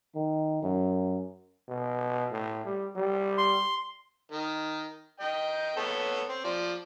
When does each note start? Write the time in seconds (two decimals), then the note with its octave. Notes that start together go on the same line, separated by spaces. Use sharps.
0.15 D#3
0.62 F#2
1.68 B2
2.32 A2
2.65 G3
2.96 G3
3.38 C6
4.31 D#3
5.20 D#5 G5
5.77 B3 A4 C#5
6.29 C4
6.44 F3 D5